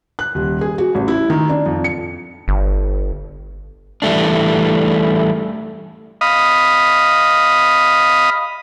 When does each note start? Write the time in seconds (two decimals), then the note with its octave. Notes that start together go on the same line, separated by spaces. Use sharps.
0.19 F#6
0.35 D#1
0.61 G#4
0.78 F#4
0.95 A1
1.08 E4
1.30 D#3
1.49 D4
1.66 F2
1.84 C#7
2.48 G1
4.02 E3 G3 A3 D4
6.21 D#5 F5 B5 D#6